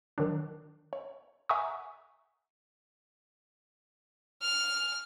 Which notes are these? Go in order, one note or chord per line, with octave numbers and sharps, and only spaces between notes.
D#3 F#3 D4
C#5
E5 F#5 G#5 A#5 C#6 D#6
F6